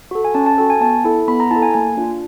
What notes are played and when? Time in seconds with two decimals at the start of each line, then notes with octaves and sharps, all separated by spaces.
0.11 F#4 A4
0.25 G#5
0.34 C#4 A5
0.46 A5
0.58 F#4 A4 G5
0.70 G#5
0.81 B3 A5
1.05 E4 A4
1.28 B3 B5
1.40 A#5
1.51 E4 A5
1.56 A4
1.62 G#5
1.74 A#3 G#5
1.97 D4 F4